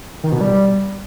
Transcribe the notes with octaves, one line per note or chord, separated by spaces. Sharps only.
D#3
B2
G3